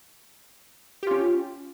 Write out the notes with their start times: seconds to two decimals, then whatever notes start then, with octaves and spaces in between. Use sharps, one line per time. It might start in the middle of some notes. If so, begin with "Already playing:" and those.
1.03 G4
1.07 F4
1.11 C#4